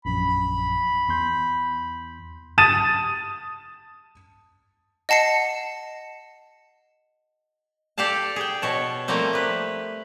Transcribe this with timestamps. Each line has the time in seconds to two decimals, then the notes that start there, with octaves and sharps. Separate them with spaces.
0.05 A#1 F#2 B5
1.09 E2 C6 G6
2.58 A5 D#6 A6 D#7 E7
5.09 D#5 F#5 A5 C7 C#7
7.98 G4 A4 D5 F5 A5
8.36 G#4 G5
8.62 B2 C#5 A5
9.08 F3 G3 A3 A#3 C4
9.33 G4 B4